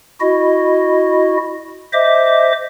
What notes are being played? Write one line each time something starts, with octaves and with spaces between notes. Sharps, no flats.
E4 F#4 D#5
C5 D#5 E5 D6